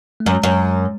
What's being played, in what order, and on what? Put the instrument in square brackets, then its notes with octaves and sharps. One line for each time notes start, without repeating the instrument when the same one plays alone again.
[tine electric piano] A3
[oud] F#2 [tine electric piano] G#3
[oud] F#2